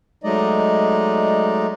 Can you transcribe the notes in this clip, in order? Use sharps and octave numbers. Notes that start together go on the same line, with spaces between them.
F#3 G#3 A3 D#4 D5 D#5